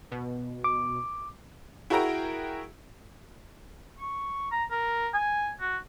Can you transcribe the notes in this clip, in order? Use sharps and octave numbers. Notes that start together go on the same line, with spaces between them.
B2
D6
E4 F#4 G#4 A#4 G5 A#5
C#6
A#5
A#4
G#5
F#4